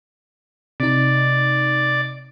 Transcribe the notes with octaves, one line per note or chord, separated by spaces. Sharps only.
C3 D#4 D5